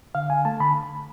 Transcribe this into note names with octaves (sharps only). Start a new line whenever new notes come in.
D3 F5
D3 G#5
A3 A5
D3 B5